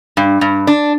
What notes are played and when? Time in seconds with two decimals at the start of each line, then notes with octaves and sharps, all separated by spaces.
0.17 G2
0.41 G2
0.67 D4